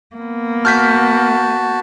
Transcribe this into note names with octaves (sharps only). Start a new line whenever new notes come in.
A#3 B3
F#4 A5 F6 G6 B6